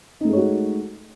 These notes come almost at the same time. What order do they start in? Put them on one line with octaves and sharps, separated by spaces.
D#4 A3 G#3 C#5 F#4